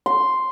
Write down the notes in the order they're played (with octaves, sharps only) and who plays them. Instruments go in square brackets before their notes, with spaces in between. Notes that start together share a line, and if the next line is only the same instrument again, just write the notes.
[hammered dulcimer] C6